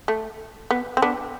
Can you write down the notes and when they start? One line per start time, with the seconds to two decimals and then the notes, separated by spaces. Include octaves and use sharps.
0.08 A3
0.71 B3
0.97 C4
1.02 B3 D4